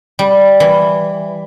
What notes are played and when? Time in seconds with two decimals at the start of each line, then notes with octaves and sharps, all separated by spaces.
0.19 G3
0.60 E3